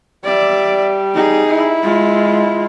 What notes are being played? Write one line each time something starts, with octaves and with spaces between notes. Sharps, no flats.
G3 D5 E5
D#4 G#4
E4
G#3 F4